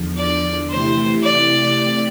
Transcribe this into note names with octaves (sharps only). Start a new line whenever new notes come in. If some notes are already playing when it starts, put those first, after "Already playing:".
Already playing: E2 D3 F3
D5
C3 E3 A3 E4 G4 C5
D5
A3 C4 E4 G4